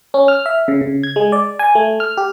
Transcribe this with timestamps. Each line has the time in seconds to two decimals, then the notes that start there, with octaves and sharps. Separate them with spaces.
0.14 C#4
0.28 F6
0.46 E5
0.68 C#3
0.81 C#3
1.03 G#6
1.16 G#3
1.32 D5
1.59 G#5
1.75 A3
2.00 F6
2.17 G4